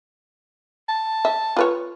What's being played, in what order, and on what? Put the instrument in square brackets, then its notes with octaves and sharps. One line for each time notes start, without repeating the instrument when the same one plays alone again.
[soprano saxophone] A5
[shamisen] E5
F4 B4 C#5